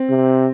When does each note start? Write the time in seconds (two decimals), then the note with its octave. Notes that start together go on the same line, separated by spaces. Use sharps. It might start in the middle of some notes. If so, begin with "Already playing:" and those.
Already playing: C4
0.10 C3